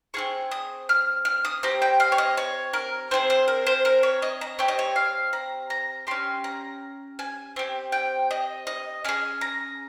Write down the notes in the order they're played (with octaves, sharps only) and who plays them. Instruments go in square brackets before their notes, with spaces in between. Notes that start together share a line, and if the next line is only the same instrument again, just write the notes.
[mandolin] C4 F4 G#4 C#6
D#6
F6
F6
D#6
C4 G4 A#5
G5
F5
C#5
D#5
C#5
A#4
C4 F4 G#4 C5
C5
A#4
C5
A#4
C#5
D#5
A#5
C4 G4 C#5
D#5
C#5
F5
A#5
A#5
C#4 G4 C6
A#5
G#5
C4 G4
G5
D#5
D#5
C#4 G#4 G#5
A#5